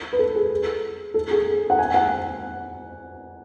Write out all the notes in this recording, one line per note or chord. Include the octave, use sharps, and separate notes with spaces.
B4
A4
G#4
A4
G#4
F#5
G#5
F#5